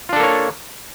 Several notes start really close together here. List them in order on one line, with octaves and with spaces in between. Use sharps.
F4 D4 A4 A#3 C#5